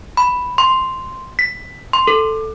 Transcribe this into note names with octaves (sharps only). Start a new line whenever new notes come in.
B5
C6
B6
C6
A4